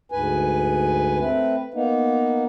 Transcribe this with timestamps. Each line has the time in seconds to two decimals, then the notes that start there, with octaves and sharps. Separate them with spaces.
0.12 D2 G#2 B4 G#5
1.19 A3 C4 B4
1.74 A#3 B3 D#4